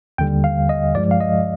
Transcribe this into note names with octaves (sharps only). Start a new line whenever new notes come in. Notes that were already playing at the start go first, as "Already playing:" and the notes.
D#2 D3 G3 G5
F5
D#5
G2 F3 G#3 D5
F5
D#5